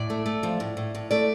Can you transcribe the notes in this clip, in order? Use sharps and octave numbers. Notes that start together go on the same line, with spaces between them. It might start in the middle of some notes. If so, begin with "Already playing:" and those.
Already playing: A2 D5
A3
A3
F3
A2
A2
A2
A3 D5